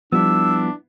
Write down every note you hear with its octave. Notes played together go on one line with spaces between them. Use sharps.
F3 G3 B3 D4 E4 E6